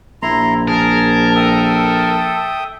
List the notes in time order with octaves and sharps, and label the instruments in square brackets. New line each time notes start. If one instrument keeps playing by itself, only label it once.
[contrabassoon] A#1 [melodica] E4 A#5 C6
[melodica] G#4 [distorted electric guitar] A#4 [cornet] A5
[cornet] A4 [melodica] E5 G5 D#6